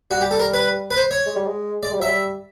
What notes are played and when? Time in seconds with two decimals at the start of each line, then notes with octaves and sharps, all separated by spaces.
0.11 G3 F#4
0.21 G4
0.31 A4
0.39 A#4
0.54 B4
0.91 B4
0.96 C5
1.11 C#5
1.26 G#3
1.36 G3
1.46 G#3
1.83 G#3 D5
1.92 G3
2.00 F#3 E5
2.09 G3